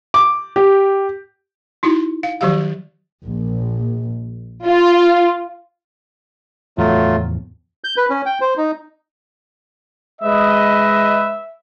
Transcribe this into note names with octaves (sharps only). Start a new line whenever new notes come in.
D6
G4
D#4 E4 F#4
F5
D#3 F3 F#3 F#4 G4 F5
A#1
F4
E2 A2 F3 F#3 A3 F4
G6
B4
C#4
G5
C5
D#4
G#3 B4 D#5 E5